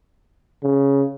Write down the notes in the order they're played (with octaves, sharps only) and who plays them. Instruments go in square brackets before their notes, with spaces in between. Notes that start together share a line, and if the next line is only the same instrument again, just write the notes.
[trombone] C#3